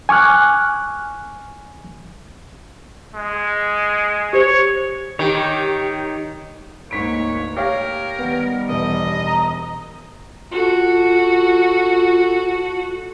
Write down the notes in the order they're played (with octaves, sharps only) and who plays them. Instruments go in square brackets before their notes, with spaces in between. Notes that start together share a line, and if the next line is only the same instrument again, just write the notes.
[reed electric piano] G#5 C#6 D6 F6 F#6
[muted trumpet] G#3
[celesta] G4 C5 [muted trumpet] C#5
[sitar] D#3 [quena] G4 [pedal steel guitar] C#5 G5
[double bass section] D2 A#3 [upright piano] G#2 B6 D7 [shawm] C#5
[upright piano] G4 C#5 F5 [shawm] A#4
[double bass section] D#3 G3 [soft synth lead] B3
[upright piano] E1 [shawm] D#5
[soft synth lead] A#5
[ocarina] F4 [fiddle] F#4 A4